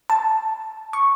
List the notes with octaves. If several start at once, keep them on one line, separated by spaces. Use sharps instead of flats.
A5
C#6